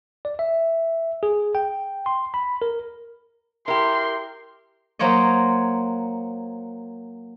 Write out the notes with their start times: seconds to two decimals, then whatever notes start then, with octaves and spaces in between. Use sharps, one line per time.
0.25 D5
0.39 E5
1.23 G#4
1.55 G5
2.06 C6
2.34 B5
2.62 A#4
3.68 E4 G4 A#4 C6
4.99 F#3 A#3 C5 C#5 D#5